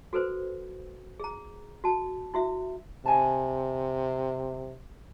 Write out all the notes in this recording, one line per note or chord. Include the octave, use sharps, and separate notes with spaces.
F#4 A4 B4 C5
G#4 A#5
F#4 A5
E4 F#4 E5
C3 D#5 G#5 A5